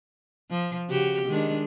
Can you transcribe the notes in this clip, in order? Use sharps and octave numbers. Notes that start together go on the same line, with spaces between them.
F3
C#3 F#4 G4
D#3 G#3 D4